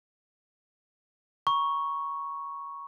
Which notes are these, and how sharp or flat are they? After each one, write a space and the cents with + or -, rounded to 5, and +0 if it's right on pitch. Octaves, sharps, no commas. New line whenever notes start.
A#5 +40 C#6 +0